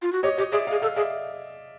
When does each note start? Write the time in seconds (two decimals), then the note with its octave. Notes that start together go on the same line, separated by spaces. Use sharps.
0.02 F4
0.12 F#4
0.23 G4 C#5 D#5
0.38 G4 C#5 D#5
0.52 G#4 D5 E5
0.67 G#4 D#5 F5
0.82 A4 D#5 F5
0.96 G#4 D5 E5